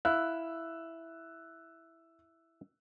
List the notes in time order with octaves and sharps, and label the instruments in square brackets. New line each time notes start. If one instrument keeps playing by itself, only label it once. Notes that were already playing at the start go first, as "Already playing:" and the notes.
[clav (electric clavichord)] E4 F5 [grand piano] E6 F#6